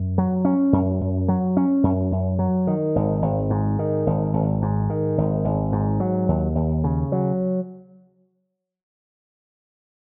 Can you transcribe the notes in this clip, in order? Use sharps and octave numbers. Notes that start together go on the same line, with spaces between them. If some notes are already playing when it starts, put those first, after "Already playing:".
Already playing: F#2
F#3
C#4
F#2
F#2
F#3
C#4
F#2
F#2
F#3
D#3
G#1
G#1
G#2
D#3
G#1
G#1
G#2
D#3
G#1
G#1
G#2
F#3
D#2
D#2
C#3
F#3